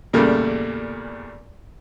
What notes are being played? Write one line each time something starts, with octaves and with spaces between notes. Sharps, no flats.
E2 A#2 C#3 G3 A3